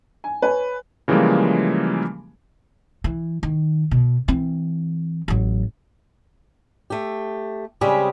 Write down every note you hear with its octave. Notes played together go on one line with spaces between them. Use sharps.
G#5
B4 C#5 G#5
C#3 E3 F3 G3 G#3 A#3
E3
D#3
B2
E3 C4
A1 F#3
A3 G4
C#3 G3 G#3 C4 G4 G#4